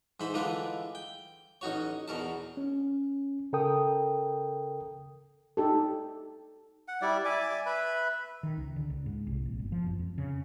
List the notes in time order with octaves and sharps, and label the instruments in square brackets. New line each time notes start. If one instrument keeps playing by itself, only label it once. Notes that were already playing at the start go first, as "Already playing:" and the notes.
[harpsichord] G#2 E3 C5 B5
D3 E3 G#3 F4 B4 D5
G5
A1 D#4 F#4 C#5
E2 B2 A#4 A5
[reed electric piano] C#4
C#3 A4 A#4 G5 D#6
[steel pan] D#4 G4 A4
[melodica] F#5
G3 E4 D5
D5 E5 G#5 D6
B4 E5 B5
[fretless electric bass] D#3
C#2
D3
C#2
G#2
C2
A#1
G1
F3
F#2
F2
C#3